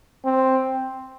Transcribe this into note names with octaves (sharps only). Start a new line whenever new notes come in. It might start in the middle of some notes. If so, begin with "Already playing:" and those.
C4